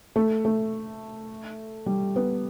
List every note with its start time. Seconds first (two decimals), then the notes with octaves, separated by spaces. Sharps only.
0.16 A3
0.45 A3
1.86 G3
2.16 B3